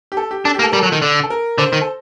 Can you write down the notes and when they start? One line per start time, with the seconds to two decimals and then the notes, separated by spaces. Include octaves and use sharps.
0.12 G4
0.17 A4
0.31 G4
0.45 D4 A4
0.54 A#3 G4
0.63 A4
0.72 G3 A#4
0.79 F#3 A4
0.92 D#3
1.02 D3
1.23 A4
1.30 A#4
1.58 D3 C5
1.73 D#3
1.81 A4